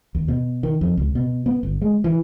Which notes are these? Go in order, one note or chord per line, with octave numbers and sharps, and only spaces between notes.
D#2
B2
D#3
F2
C#2
B2
B3
G1
G#3
E3